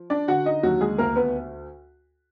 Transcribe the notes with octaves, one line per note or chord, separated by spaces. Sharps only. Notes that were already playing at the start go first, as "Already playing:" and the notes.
Already playing: F3
D4 D5
D3 F#4 F#5
D#4 D#5
D#2 F#3 F#4
G#3 G#4
D2 A#3 A#4
B3 B4